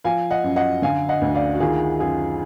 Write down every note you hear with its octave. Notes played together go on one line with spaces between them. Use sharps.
F3 F5 G#5
D#5 F#5
F#2
D#5 F#5
D3 F5 G#5
D#5 F#5
D2
D5 F5
F#4
D#3 F4 G#4
F#2 F4 G#4